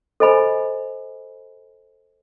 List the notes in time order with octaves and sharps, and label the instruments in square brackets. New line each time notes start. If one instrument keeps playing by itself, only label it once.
[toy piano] A4 C5 D#5 G#5 B5